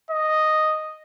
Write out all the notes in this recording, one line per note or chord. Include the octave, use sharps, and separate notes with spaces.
D#5